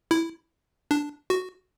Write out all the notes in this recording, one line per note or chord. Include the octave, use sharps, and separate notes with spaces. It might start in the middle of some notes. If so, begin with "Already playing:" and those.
E4
D4
F#4